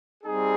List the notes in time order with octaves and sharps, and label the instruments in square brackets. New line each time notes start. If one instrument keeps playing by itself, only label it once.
[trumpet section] G3 C4 D#4 G#4